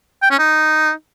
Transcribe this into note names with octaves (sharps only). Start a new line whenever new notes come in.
G5
C#4
D#4